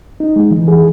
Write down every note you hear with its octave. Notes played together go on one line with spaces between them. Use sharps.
D#4
G#3
E3
G#4